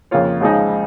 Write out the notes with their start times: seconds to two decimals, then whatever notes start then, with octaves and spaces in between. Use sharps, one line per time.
0.11 F2 C#3 A#3 F4 C#5
0.41 C#2 C#3 F3 G#3 D#4